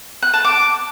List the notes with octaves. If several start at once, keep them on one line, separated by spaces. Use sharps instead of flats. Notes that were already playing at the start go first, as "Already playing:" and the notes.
F#6
A5
D6